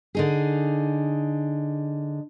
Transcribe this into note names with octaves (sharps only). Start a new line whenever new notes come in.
D3 D#4 G#4